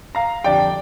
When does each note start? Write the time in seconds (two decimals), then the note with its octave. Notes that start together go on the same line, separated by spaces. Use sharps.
0.15 F5 A#5
0.44 F2 D3 G3 D4 D5 G5